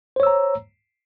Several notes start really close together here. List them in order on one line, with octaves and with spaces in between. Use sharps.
C5 C#5 E6 A#5